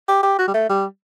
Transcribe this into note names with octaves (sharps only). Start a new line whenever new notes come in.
G4
G4
F#4
G3
A3
G3